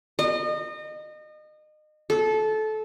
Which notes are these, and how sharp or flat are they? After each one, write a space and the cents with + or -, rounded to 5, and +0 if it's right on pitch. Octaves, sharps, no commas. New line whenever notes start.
D#5 -30
A4 -20